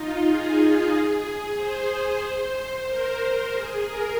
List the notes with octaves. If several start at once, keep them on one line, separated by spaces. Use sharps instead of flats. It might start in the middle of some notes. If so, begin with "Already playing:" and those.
Already playing: D#4 F4
G#4
C5
A#4
A#4
G#4
A#4